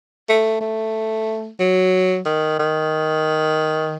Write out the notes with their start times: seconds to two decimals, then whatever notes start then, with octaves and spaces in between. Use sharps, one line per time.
0.29 A3
0.60 A3
1.59 F#3
2.25 D#3
2.59 D#3